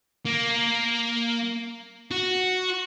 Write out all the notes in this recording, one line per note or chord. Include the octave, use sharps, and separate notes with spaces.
A#3
F#4